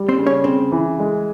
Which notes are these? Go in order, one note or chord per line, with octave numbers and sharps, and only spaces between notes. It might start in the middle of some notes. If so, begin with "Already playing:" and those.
Already playing: G3
C4 C5
C#3
C#4 C#5
C#3 C4 C5
E3
G#3